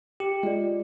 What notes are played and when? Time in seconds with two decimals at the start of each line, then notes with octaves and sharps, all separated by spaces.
0.20 G4 C#7
0.43 G#3 F4 D5